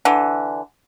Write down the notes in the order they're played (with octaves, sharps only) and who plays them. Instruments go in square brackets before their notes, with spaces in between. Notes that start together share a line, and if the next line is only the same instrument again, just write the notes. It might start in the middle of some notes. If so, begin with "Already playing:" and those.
[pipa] D3 E3